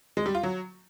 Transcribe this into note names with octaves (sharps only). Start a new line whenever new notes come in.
G#3
G3
F4
F#3